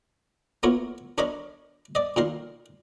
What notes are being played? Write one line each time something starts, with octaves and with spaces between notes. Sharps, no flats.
A#3 B3 E4 F4 A#4 C#5
D4 A#4 C#5 D#5 A#5 B5
D5 D#5
A#2 D#3 A#4 C6